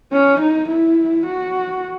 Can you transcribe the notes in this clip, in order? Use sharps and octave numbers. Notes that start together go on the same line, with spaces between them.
C#4
D#4
E4
F#4